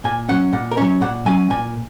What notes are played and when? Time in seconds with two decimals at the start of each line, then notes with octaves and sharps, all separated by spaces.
0.04 A#2 G#5
0.29 F#3 C#4 F#5
0.53 A#2 F#5
0.71 A#4
0.77 F#3 C#4 C#5
1.01 A#2 F#5
1.26 F#3 C#4 G#5
1.50 A#2 G#5